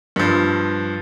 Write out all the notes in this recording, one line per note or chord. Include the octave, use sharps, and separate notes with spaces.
G2 F3